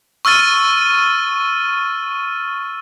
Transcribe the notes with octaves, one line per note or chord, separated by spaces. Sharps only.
C#6 E6 F6 A6 D#7